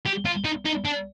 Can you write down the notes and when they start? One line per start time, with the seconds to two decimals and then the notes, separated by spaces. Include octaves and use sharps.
0.06 G4
0.25 F4
0.44 D#4
0.65 D#4
0.85 D4